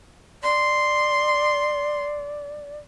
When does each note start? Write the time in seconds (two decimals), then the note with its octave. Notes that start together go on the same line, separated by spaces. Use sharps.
0.43 D5 C6